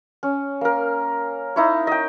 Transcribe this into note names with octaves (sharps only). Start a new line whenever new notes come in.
C#4
A#3 A#4
D#4 E4 C#5
D#5 G5